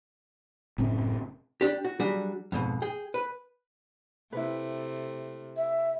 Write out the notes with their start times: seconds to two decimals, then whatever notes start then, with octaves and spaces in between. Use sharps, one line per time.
0.78 F#1 A2 C4 C#4
1.61 D4 G4
1.85 F#4
2.00 F#3 G3 D4 F#4 G#4
2.52 F2 G#2 B2
2.82 G#4 G5
3.14 B4
4.32 C3 A3 E4 B4
5.57 E5